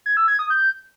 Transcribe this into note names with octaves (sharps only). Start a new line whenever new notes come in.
G#6
E6
G#6
D#6
G6